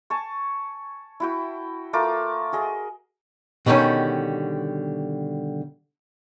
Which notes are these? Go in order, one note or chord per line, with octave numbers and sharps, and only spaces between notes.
G#5 A5 C#6
E4 F#4 G5
A3 F4 A#4 D6
F#4 G#4 D#5
B2 D3 D#3 G3 C#4